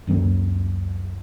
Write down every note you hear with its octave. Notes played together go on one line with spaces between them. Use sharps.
C#2 F#2 F#3 A#3